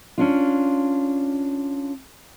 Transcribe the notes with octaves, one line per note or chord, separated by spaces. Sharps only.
C#4 D4 F4